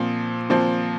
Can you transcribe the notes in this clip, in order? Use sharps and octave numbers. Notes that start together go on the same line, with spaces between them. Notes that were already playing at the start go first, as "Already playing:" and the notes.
Already playing: A#2 F3 C4
A#2 F3 C4